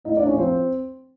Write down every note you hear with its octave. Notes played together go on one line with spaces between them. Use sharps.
A2 D#4 D#5
D4 D5
A2
C#4 C#5
F3 C4 C5